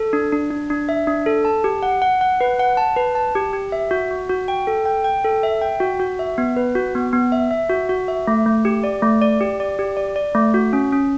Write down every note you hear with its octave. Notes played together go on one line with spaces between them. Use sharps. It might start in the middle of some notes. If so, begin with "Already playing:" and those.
Already playing: A4
D4
D4
D4
D4
E5
D4
A4
A5
G4
F#5
F#5
F#5
B4
F#5
A5
B4
A5
G4
G4
E5
F#4
F#4
F#4
G5
A4
G5
G5
A4
E5
G5
F#4
F#4
E5
B3
B4
F#4
B3
B3
E5
E5
F#4
F#4
E5
A3
A3
G4
D5
A3
D5
G4
D5
G4
D5
D5
A3
F#4
C#4
C#4